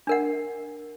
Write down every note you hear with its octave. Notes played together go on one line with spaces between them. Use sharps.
D4 A#4 F#5